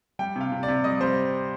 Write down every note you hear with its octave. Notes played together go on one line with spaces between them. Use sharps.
G3 G5
C3 F5
C3
D5
C3
G3 D#5
G3 C5